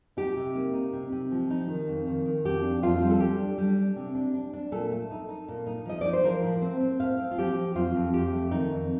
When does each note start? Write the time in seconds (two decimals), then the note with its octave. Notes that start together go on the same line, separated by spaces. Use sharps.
0.17 D#4 G4
0.37 C3
0.55 A#3
0.74 D#4
0.93 C3
1.12 C3
1.31 F3
1.50 D#4
1.68 D#3
1.88 F2
2.07 D#3
2.26 D#3
2.45 F2 G4
2.63 D4
2.82 F2 F4
3.02 G3
3.10 A4
3.20 G3 G4
3.39 D4
3.58 G3
3.78 D4
3.96 C3
4.15 D4
4.34 D4
4.53 D4
4.72 A#2 A4
4.92 A3
5.11 D#4
5.29 D#4
5.48 A#2
5.67 D#4
5.85 F3 D#5
6.01 D#4 D5
6.13 C5
6.24 F3 A#4
6.42 A2
6.61 C4 C5
6.80 C4
7.00 A2 F5
7.19 C4
7.31 F4
7.38 F3 G4
7.56 C4
7.75 F2 F4
7.94 F2
8.13 F2 G4
8.32 A3
8.51 D#3 D#4
8.70 F2